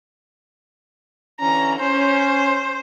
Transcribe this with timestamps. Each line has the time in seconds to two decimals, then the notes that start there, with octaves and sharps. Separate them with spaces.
1.40 D3 E3 C#4 A#5
1.79 C#4 C5